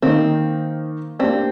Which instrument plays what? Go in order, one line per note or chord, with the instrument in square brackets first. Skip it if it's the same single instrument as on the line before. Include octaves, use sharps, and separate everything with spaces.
[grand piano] D#3 A#3 D#4 [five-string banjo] C4
[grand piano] A#3 D4 G4 D5 [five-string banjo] C4